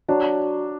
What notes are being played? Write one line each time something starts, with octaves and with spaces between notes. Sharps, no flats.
F#3 D4